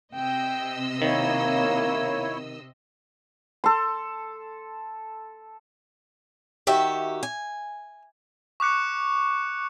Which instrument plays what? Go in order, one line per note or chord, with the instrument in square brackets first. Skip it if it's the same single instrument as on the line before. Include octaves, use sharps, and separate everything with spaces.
[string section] C3 D#5 E6 [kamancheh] G5
[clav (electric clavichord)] D#3 [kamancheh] A#3 [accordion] E4 C#5
[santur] A4 C6
[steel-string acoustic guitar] D#3 F#4 G4 E5
G#5
[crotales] C#6 D6 F#6 C#7